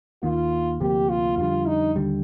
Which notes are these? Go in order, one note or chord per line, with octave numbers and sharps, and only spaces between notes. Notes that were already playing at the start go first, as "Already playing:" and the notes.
D#2 D#3 A#3 F4
D2 C3 F3 A#3 G4
F4
F2 D3 G3 F4
D#4
D#2 D3 G3